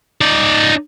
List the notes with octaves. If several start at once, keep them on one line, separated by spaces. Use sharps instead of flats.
D#4 D5